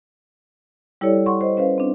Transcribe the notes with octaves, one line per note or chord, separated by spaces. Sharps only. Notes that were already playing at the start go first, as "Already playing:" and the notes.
G3 E4 G4 A4 C#5 D5
F#5 C6 C#6
C5 D#5
C#4 B4 C5 F5
C4 D4